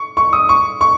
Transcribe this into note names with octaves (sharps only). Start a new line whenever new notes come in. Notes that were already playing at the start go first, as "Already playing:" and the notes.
Already playing: C#6
C#6
D#6
C#6
C#6